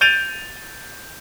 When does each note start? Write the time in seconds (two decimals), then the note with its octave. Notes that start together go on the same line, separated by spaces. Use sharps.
0.01 G6 A6 D7 D#7 F7